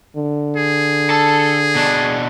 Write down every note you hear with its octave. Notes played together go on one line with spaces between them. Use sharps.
D3
G#4
A4 A5
B2 D4